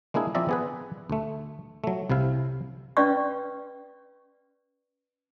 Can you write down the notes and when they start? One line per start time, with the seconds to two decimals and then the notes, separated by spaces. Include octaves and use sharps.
0.14 G#3 A#3 D4 E4 G#4
0.35 F3 C4 D5 E5 A#5
0.49 B3 G#4 B4
1.10 D2 A3
1.84 F#3 A3
2.09 C2 C3 E4 F5
2.97 C#4 B4 D5 C#6